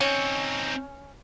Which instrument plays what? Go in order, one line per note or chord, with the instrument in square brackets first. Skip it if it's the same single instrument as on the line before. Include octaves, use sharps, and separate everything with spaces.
[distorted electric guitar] C4 D#4 [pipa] C#4